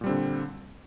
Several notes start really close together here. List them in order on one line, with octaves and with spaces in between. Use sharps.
A#2 G3 C4 D3